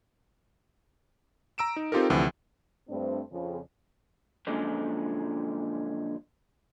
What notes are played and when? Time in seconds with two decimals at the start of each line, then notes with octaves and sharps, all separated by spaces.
1.58 A#5 E6 D7 E7
1.76 D#4
1.92 C4 D#4 F4 G4 A4 A#4
2.10 D2 C3 E3 F3
2.89 G2 A3 C4 D4 C5
3.32 F2 C#3
4.47 F#2 A#2 D3 F3 G#3